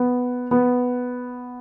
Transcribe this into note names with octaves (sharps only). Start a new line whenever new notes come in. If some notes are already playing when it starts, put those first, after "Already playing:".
Already playing: B3
B3